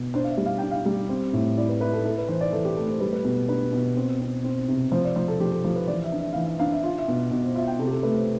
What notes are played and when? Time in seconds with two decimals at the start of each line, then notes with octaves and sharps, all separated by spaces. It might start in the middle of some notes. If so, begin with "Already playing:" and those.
Already playing: B2
0.14 D4 C5
0.24 F5
0.29 E5
0.37 G3
0.46 F5
0.58 D4 G5
0.71 F5
0.85 G3
1.09 C4
1.33 A2
1.57 E4 D5
1.69 B4
1.81 E4 B4
1.93 A4
2.05 E4 A4
2.18 B4
2.29 E3 C5
2.41 D5
2.53 E3 A4
2.65 G4
2.77 A3 A4
2.88 C5
3.00 G3 B4
3.13 B4
3.25 B2
3.48 D4 B4
3.73 B2
3.97 C4
4.20 C4
4.44 C4
4.68 C3
4.92 F3 C5
5.05 D5
5.16 F3 C5
5.28 A4
5.40 F3 G4
5.52 A4
5.64 F3 A4
5.76 B4
5.87 E3 D5
6.04 E5
6.12 D4
6.20 E5
6.33 E3 F5
6.46 E5
6.59 D4 F5
6.72 E5
6.84 F4 F5
6.98 E5
7.08 B2
7.31 B2
7.44 C5
7.55 F4 E5
7.68 G5
7.79 C3 A4
7.87 G4
7.91 A4
8.03 A3 B4
8.15 C5